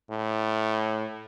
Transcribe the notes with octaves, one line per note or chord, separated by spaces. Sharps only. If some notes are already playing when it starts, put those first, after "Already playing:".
A2